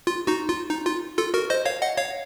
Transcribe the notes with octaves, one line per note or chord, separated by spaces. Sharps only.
F4
D#4 F#4
F4
D#4
F4
F4 A4
F#4 A#4
C5 D#5
C#5 F5
D#5 F#5
C#5 F5